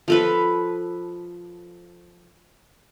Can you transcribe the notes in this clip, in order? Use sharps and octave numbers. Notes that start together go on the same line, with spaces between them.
F3 A4 B4